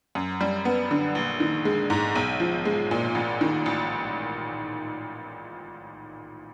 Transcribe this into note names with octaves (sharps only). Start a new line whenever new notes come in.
F#2
G3
B3
D3
A#1
D#3
G#3
G#2
B1
F3
G#3
A#2
A1
D#3
A1